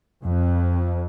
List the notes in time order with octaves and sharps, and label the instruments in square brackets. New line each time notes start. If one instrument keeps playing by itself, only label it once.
[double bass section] F2